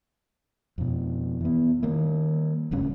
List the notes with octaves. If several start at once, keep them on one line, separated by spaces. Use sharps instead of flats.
F2 B2
E3 B3
D#3 G3 A#3
D1 C#2 G2 C#4